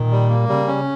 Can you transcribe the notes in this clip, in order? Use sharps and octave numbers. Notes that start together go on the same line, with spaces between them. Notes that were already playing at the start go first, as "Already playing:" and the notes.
Already playing: A#2 D#3
G3
A#3
C#3 G3
C#4